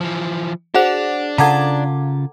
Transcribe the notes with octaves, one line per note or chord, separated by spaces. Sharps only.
E3 F3
D4 F#4 G#4 C5 F#5 F7
C#3 F4 A4 F#5 A5 A#5 D6 G#6